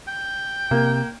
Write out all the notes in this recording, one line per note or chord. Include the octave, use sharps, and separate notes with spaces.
G5
C3 A#3